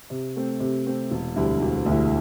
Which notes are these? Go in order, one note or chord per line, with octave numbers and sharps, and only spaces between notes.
C3
A3 C4
C3
A3 C4
E1
D2 D3 G3 E4
E1
D2 D3 G3 E4